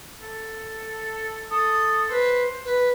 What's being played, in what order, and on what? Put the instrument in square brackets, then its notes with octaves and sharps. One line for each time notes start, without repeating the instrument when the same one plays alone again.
[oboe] A4
[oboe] A4 [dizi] D#6
[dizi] B4 [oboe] C5
[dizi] B4